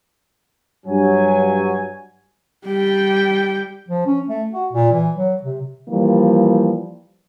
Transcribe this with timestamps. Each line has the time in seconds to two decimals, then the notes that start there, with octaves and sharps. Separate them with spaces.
0.86 G2 F#3 G#5
2.67 G3 G5
3.88 F3
4.06 C#4
4.28 A3
4.53 F#4
4.73 A#2
4.92 E3
5.16 F#3
5.43 C3
5.88 E3 F3 G3 A#3